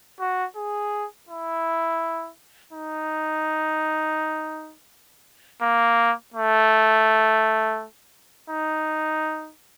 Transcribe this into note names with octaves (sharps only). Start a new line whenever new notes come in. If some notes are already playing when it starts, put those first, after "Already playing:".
F#4
G#4
E4
D#4
A#3
A3
D#4